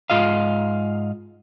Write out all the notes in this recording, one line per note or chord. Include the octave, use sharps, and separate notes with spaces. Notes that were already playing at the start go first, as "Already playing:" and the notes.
G#2 F4 D#5 F5